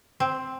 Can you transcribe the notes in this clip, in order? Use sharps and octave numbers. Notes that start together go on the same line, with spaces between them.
C4